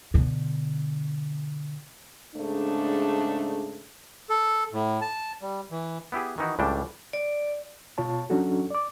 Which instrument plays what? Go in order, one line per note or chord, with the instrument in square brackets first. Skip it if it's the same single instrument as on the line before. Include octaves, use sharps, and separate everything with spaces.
[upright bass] B2 D3
[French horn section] G#2 C#3 A3 D4
[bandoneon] A4
A2
A5
G3
E3
[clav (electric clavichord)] B3 E4 G4 G#4
D#3 E3 D#4 E4 F#4
C#2 A2 G3 D4 G5 A5
[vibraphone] D5
[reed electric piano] B2 F4 C#5 A5
F#3 C#4 D4 F#4 A4
D5 D6